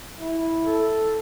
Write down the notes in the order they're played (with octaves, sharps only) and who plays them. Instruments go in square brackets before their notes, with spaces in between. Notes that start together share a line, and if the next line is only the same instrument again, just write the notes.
[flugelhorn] E4
[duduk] A4